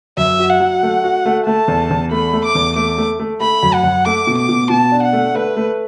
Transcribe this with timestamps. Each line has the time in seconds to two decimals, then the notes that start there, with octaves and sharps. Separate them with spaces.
0.17 F#2 E5
0.39 F#4
0.50 F#5
0.60 F#3
0.83 A3
1.04 F#4
1.26 A3
1.47 A3 A5
1.68 E2
1.90 E2
2.11 A3 B5
2.33 A3
2.44 D6
2.55 E2
2.76 A3 D6
2.98 A3
3.20 A3
3.40 A3 B5
3.63 F#2
3.74 F#5
3.84 F#2
4.05 A3 D6
4.27 B2
4.38 D6
4.49 B2
4.70 B2 A5
4.92 D4
5.03 F#5
5.13 A3
5.34 A3 B4
5.57 A3